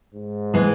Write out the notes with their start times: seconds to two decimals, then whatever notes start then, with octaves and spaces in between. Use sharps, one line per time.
0.14 G#2
0.54 E3 G#3